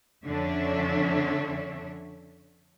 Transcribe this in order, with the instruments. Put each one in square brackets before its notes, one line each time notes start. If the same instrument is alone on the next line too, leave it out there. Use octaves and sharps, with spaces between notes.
[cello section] F2 D3 C#4 D4 C#5 E5